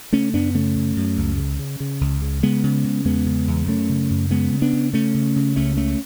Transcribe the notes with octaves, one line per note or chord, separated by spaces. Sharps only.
C#3 A3 C#4
F#2 B3 D4
C#3 A3 C#4
F#2
F#2
C#2
C#3
C#3
C#3
C#2
C#3
C#3 G#3 B3
C#3
C#3
E2 G#3 B3
C#3
E2
F#2 A3 C#4
C#3
F#2
C#3 G#3 B3
C#3
B3 D4
C#3
C#3 A3 C#4
C#3
C#3
C#2 A3 C#4
C#2 A3 C#4